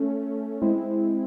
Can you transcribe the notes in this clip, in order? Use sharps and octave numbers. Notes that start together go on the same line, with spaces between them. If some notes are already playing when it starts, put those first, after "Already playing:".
Already playing: A3 C#4
G#3 C4 E4